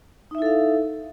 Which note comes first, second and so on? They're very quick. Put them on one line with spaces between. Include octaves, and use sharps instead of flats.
D#4 E5 E4 A4 F5